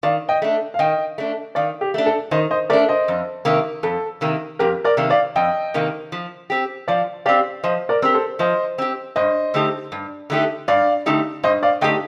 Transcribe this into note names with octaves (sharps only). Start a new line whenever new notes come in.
D#3 D5 F5
D#5 G5
A3 D4
F5
D#3 D#5 G5
A3 D4
D#3 D5 F5
G4
A3 D4
A4
D#3 C5 D#5
C5 D#5
A3 D4 A#4 D5
C5 D#5
F2
C3 D#3 A#3
F2 A4
C3 D#3 A#3
F2 G4 A#4
A#4 D5
C3 D#3 A#3
D5 F5
F2 D#5 G5
C3 D#3 A#3
F3
C4 G4
F3 D5 F5
C4 G4 D5 F5
F3 C5 D#5
A#4 D5
C4 G4 A#4
A4 C5
F3 C5 D#5
C4 G4
G2 C5 D#5
D3 A3 D#4 G4
G2
D3 A3 D#4 G4
G2 D5 F5
D3 A3 D#4 G4
G2 C5 D#5
D5 F5
D3 A3 D#4 G4 D#5 G5